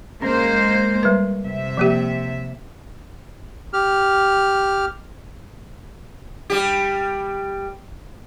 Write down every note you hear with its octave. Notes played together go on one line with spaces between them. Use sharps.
G#3 A#3 C#4 C5
G3 B4
C3 E5
F3 A#3 G4
G4 F6
G3 G4